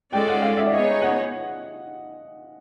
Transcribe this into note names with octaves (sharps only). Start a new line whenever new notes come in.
G#3 C#4 F4 A4 D5 G5
F#5
F5
E5
D5
B3 D#4 G#4 C#5 D#5
F#5